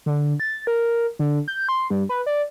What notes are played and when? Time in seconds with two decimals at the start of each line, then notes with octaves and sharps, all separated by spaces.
0.06 D3
0.40 A6
0.67 A#4
1.19 D3
1.48 G6
1.69 C6
1.90 G2
2.09 B4
2.26 D5